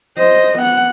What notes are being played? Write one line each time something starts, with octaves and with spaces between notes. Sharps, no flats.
C5 D#5
B3 F#5